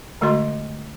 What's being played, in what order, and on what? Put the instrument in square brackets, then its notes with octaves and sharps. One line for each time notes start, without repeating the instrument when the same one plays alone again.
[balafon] D3 G#3 A3 F#4 D#5 C6